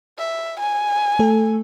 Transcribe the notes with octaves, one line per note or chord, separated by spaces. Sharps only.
E5
G#5
A3 A4